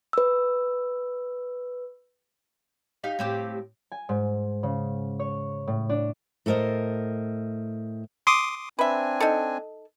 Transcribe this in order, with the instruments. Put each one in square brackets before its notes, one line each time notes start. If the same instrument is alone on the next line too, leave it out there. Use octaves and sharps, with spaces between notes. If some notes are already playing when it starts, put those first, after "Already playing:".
[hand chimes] B4 E6
[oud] D#4 G4 F5
A2 C4 G4
[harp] G#5
G#2
C#3
C#5
A2
D4
[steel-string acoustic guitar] A2 A4 A#4 C5 D#5
[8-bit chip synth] C6 D6 D#6
[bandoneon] C4 D4 G#5 [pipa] B4 E5
[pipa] D#4 A4